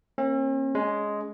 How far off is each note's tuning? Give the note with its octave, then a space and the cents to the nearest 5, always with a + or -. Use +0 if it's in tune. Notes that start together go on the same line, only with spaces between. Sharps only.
A#3 +0 C#4 -45
G#3 +5 C#4 +25